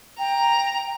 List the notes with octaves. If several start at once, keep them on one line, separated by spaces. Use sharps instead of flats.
G5 A#5